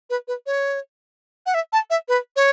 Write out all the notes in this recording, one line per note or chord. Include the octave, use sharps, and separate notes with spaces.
B4
B4
C#5
F#5
E5
A5
E5
B4
C#5